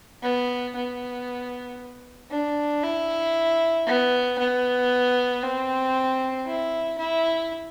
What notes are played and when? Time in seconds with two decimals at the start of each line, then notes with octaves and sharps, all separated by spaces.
0.23 B3
0.76 B3
2.30 D4
2.83 E4
3.87 B3
4.38 B3
5.43 C4
6.47 E4
6.99 E4